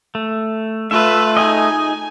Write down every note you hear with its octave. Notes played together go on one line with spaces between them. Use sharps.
A3
A3 F4 B4 E5
D#4 G#4 D#5 G#5